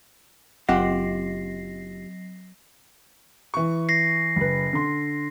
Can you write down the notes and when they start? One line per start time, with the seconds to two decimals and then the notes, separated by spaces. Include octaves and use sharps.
0.69 F#1 F#3 F4 G4 F#5 A#6 C7
3.54 E3 C#6
3.89 A#6 C7
4.36 F#1 B4
4.73 D3 C6